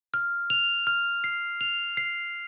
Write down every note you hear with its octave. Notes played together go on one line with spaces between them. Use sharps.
F6
F7
F6
C7
F7
C7